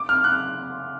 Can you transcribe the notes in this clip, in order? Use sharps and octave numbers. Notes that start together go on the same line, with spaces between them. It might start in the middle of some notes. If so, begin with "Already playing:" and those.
Already playing: D6
F6
F#6